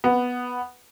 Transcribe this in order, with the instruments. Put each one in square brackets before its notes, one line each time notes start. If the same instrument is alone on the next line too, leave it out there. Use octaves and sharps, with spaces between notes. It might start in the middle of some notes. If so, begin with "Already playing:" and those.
[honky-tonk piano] B3